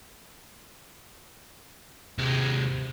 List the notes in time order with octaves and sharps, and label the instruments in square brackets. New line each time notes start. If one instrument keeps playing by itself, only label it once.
[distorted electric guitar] D#2 G#3 [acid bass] C3